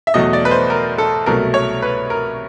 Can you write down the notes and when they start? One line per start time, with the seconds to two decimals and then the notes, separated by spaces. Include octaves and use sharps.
0.07 E5
0.14 E2 B2 F#3 A3 D#5
0.33 D5
0.45 B4
0.51 C5
0.70 A#4
0.98 A4
1.26 C2 B2 F#3 A3 A#4
1.54 C#5
1.82 B4
2.10 A#4